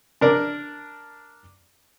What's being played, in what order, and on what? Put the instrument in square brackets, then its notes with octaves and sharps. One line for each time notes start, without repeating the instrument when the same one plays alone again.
[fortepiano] D4 A#4 D5